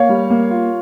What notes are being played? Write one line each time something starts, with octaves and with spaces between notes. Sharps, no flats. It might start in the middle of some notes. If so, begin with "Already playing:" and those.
Already playing: A#3 C#5 F5
G3
A#3
F4